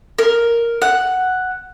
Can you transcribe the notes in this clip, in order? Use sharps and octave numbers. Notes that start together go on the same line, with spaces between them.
A#4
F#5